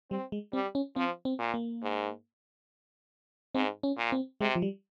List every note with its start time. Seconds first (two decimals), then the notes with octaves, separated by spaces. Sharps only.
0.11 G3 C4
0.32 G#3
0.53 G3 C4
0.75 C#4
0.96 F3 C4
1.25 C4
1.39 A#2
1.54 A#3
1.83 G#2
3.55 G#2 C4
3.83 C#4
3.97 A#2
4.12 C4
4.41 C3 G#3
4.56 F3
4.62 G3